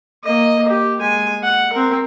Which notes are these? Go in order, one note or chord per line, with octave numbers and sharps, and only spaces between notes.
A#3 D#5
G4
G#3 G#5
F#5
C4 A#4